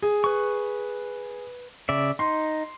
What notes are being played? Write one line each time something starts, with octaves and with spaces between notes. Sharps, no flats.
G#4
B4 C#6
C#3 D5 E5
D#4 C6